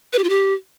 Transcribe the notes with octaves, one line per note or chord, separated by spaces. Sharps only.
B4
G4
F4
G4